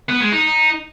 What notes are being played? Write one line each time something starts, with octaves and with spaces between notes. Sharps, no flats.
B3
G#3
D#4